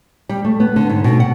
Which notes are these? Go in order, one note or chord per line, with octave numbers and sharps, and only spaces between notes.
G3
A3
B3
D3
G#2
B2
F#5